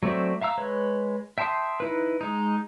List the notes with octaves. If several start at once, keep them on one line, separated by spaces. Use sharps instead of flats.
F#3 A3 C4 D5 E5
E5 F5 A#5 E6
G#3 B4 C#5
E5 G5 A5 C6 D#6
D#4 E4 B4
G#3 D#4